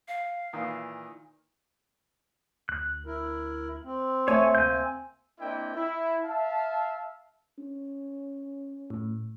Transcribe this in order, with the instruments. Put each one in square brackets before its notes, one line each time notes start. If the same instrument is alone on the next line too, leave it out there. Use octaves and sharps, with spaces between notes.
[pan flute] F5
[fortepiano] A#2 D#3 E3
[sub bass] D2 [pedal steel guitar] F#6
[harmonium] E4 A#4
C4
[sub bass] A1 [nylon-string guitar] A3 C5 E5 [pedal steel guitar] C#5 G#5 C#6
[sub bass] D2 [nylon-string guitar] C3 A#3 [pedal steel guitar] G#5 G6
[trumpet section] A#3 C4 D4 E4 D#5 G5
E4
E5 F5 A5
[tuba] C#4
[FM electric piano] A2